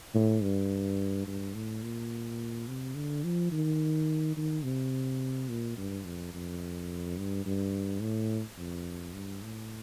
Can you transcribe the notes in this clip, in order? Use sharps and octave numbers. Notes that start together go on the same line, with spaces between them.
A2
G2
G2
A2
A#2
C3
D3
F3
D#3
D#3
C3
A#2
G2
F2
F2
G2
G2
A2
F2
G2
A2